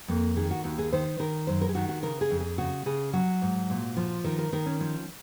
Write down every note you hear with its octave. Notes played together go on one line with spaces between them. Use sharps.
F2 A#3
D#3 G#4
F#4
D#2 F#4
G#4
D#3 C5
D#3 A#4
F#2 C5
A#4
G#4
D#3 F#4
F#4
C#3 A#4
G#4
F2
G#4
C#3 F#4
C#3 G#4
F#3 F#4
G#2
A#2
F3
D#3 A#4
A#4
D#3 A#4
C#4
F3 C#4